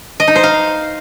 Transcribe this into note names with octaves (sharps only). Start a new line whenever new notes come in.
D#5
D#4
C5
F5